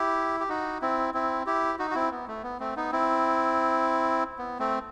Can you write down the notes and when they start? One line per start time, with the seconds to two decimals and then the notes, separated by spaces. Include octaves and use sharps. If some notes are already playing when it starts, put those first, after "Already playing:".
Already playing: E4 G4
0.40 G4
0.49 D#4 F#4
0.82 C4 E4
1.14 C4 E4
1.46 E4 G4
1.79 D#4 F#4
1.91 F#4
1.95 C4 E4
2.11 B3
2.28 A3
2.43 B3
2.60 A3 C4
2.76 B3 D#4
2.92 C4 E4
4.39 B3
4.59 A3 C4